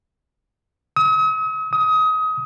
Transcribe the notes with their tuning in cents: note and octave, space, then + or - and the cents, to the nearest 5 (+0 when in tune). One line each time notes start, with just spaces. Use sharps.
D#6 +45
D#6 +25